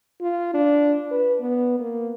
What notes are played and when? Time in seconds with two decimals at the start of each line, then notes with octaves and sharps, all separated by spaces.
0.21 F4
0.54 D4
1.11 B4
1.41 B3
1.80 A#3